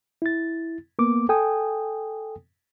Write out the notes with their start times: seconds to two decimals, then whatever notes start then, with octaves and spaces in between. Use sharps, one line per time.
0.22 E4 A6
0.99 A#3 B3 D6
1.29 A4 G5 G#5 D#6